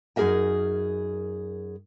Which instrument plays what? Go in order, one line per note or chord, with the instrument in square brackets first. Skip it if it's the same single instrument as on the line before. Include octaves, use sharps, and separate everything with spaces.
[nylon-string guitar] F#2 D#4 G#4 A#4 E5 G#5